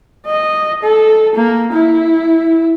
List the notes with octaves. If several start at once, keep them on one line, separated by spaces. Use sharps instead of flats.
D#5
A4
A#3
E4